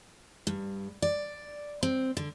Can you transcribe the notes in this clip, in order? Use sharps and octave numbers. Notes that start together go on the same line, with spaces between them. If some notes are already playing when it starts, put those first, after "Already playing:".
G2
D5
C4
D3